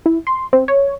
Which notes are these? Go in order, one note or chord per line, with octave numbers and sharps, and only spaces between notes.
E4
C6
C4
C#5